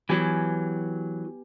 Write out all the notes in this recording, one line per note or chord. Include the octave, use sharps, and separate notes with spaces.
E3 F#3 B3 G4 G#5